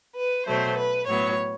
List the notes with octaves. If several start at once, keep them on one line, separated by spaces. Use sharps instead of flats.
B4
B2 F#3 A3 C5
B4
A2 F#3 B3 C#5